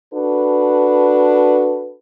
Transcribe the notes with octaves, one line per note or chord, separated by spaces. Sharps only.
D4 F#4 A4 B4